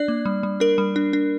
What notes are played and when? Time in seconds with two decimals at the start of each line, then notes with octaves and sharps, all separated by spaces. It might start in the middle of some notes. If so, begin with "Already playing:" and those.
Already playing: D4 D5
0.08 A#3
0.25 G3
0.43 G3
0.60 D4 A#4
0.78 G3
0.96 D4
1.13 D4